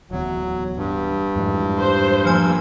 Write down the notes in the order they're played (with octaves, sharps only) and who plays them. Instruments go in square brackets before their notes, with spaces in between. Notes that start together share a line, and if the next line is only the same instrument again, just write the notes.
[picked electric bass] D1 E2 [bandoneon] F#3
[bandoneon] G2
[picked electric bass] F2 G#2 E3
[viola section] G3 C5
[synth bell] F3 G#5 E6 [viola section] A#3